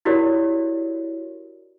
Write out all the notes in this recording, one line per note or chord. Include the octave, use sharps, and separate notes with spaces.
E4 F#4 G4 A#4 C#5 D5